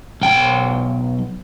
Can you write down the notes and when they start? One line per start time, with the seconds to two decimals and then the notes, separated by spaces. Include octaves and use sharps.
0.21 B1 G5